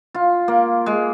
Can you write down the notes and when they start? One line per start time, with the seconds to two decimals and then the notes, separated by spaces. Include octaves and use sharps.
0.14 F4
0.48 A#3
0.86 G#3